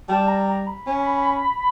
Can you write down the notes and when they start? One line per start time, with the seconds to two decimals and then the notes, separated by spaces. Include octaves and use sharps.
0.08 G3 A5
0.28 A#5
0.47 A#5
0.67 B5
0.86 C#4